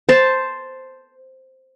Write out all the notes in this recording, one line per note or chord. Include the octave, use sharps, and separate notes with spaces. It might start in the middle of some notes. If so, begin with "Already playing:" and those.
C5 A5